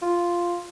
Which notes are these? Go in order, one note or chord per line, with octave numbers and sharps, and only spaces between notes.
F4